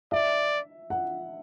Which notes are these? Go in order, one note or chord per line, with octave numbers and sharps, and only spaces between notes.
D5 E5
F#5